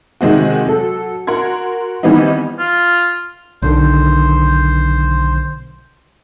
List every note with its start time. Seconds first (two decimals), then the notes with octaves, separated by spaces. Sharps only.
0.21 C3 D#3 G#3 C4 F#4
0.66 F#3 A4
1.27 F#4 A#4 F#5 C6 G#6
2.03 D#3 E3 G3 B3 C4 D#4
2.59 F4
3.62 B1 D3 D#3 C5